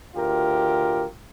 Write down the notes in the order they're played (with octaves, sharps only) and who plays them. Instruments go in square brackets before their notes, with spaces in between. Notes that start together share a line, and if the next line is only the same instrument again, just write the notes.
[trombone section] D2 F4 G4 A#4